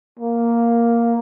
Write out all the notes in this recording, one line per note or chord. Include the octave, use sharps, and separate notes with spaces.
A#3